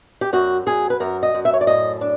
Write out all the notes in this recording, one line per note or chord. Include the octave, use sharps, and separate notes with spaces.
G4
F#2 F#4
F#2 G#4
B4
F#2 A#4
D#5
F#2
E5
C#5
D5
A2 D#5
D4